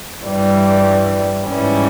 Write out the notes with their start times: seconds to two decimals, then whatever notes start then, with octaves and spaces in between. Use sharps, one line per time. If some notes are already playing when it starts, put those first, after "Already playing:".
0.24 G2 E3 G3
1.47 G#2 E3 G3 C#4